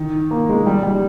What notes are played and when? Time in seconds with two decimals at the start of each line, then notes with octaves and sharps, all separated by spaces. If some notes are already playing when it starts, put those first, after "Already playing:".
Already playing: D#3
0.31 A#3
0.49 G#3
0.67 G3
0.83 G3